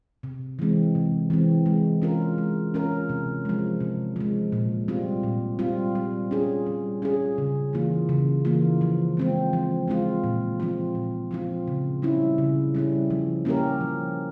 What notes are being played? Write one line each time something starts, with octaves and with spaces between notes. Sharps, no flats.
C3
E3 G#3 C4
C3
E3 G#3 C4
G#3
C#4 F4 A#4
G#3
C#4 F4 A#4
C3
F3 G#3
C3
F3 G#3
A#2
G3 C4 F4
A#2
G3 C4 F4
G3
C#4 F4 G#4
G3
C#4 F4 G#4
C#3
E3 A#3 F4
C#3
E3 A#3 F4
F3
G#3 C4 F4
F3
G#3 C4 F4
A#2
F3 C4 F4
A#2
F3 C4 F4
C#3
G3 C#4 E4
C#3
G3 C#4 E4
F3
A#3 C#4 G4 A#4
F3